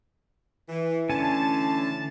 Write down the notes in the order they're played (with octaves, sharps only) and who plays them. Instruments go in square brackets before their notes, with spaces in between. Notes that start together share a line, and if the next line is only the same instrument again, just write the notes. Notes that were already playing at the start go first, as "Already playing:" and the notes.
[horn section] E3
[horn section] A2 E3 A5 [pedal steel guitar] D3 C#4 G#5